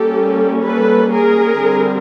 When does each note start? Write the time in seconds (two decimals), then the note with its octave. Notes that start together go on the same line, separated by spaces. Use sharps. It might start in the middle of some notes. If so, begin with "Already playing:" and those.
Already playing: G3 A#3 C#4 G4 A4
0.62 A4 B4
1.12 G#4 A#4
1.62 D3 G3 C4